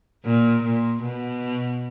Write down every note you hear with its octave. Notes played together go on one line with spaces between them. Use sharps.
A#2
A#2
B2